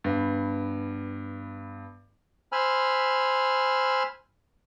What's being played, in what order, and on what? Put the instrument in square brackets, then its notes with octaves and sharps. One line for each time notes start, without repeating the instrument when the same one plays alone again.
[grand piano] G2 B3
[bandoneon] C5 G#5 B5 E6 F6